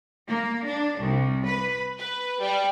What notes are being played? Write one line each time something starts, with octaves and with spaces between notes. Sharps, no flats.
A#3
D4
C2
B4
B4
G3